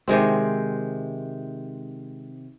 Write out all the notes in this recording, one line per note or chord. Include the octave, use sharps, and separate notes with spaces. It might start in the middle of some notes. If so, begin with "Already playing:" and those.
C3 D#3 G#3 C4